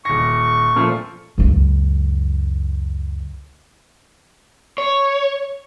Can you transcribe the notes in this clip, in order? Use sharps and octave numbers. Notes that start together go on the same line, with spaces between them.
D#1 C#6 A#6
A#2 F3 A3
C#2 F#2
C#5